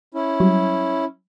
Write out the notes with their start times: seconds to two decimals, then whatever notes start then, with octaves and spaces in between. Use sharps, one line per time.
0.14 C#4 E4
0.40 F#3 G3